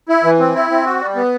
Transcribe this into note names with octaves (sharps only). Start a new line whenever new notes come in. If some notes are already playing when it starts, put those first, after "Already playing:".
E4
E3
C4
E4
C4
F#4
G3
B3